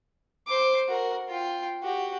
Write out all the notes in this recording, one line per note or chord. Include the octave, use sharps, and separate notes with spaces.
C5 D6
F#4 A#4
F4 G5
F#4 G4